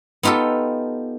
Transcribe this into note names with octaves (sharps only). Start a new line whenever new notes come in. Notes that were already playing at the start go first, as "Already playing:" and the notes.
B3 D#4 F4 G4 A4